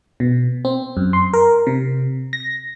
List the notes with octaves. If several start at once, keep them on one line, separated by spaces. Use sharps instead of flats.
B2
C4
F#2
C6
A#4
C3
A#6